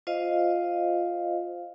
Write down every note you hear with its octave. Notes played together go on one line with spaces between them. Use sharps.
F4 C5 D#5 F5